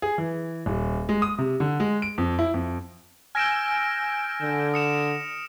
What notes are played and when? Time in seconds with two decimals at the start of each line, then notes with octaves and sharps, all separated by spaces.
0.02 G#4
0.18 E3
0.66 D#1
1.09 G#3
1.22 D#6
1.38 C3
1.60 D3
1.80 G#3
2.02 D7
2.18 F2
2.39 E4
2.54 F2
3.35 G#5 E6 F6 G6 A#6 D7
4.42 D3
4.74 D#6 C#7 E7